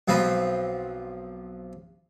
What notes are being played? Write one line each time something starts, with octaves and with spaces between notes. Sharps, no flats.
B1 F3 F#3 C4 B4